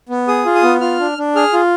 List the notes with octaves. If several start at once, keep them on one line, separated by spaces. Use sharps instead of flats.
B3
G#4 D#6
F4
D#6
B3
F4 F6
D4
D4
G#4 F6
F4